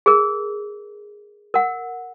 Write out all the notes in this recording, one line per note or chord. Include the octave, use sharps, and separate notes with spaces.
G#4 A#4
A#4 F#5